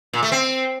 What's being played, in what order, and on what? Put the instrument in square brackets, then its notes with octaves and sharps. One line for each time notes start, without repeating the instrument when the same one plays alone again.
[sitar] A#2
A3
C4